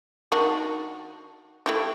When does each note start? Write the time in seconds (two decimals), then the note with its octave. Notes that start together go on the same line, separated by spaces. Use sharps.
0.32 D#3 D4 F#4
1.66 A3 E4 G4